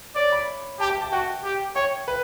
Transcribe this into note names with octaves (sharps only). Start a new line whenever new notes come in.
C#5 D5
B5
G4 A5
G5
A5
F#4 G5
G4
C#5 G5
B4